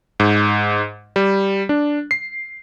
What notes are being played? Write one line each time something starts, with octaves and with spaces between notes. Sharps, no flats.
G#2
G3
D4
C7